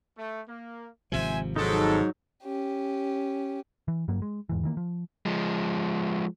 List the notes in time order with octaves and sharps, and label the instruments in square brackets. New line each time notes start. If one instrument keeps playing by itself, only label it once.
[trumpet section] A3
A#3
[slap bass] G#1 C3 F3 [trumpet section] C5 E5 G#5
[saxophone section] G#2 [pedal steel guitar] F#3 D#4 [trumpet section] A4
[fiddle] C#4 G4
[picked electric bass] E3
G2 F#3 A#3
G#3
E2 G#2 E3
D#3 E3 A#3
F3
[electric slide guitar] F3 G#3